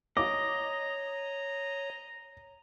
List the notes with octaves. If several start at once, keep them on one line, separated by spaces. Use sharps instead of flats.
C#5 D#5 A#5 D6